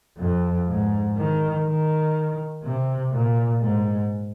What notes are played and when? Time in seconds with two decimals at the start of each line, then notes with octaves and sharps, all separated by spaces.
0.17 F2
0.66 G#2
1.15 D#3
1.64 D#3
2.62 C3
3.11 A#2
3.60 G#2